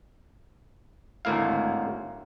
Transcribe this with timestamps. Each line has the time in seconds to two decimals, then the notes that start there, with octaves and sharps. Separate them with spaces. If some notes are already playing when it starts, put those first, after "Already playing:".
1.25 G#1 D2 A2 A#3 E4 F5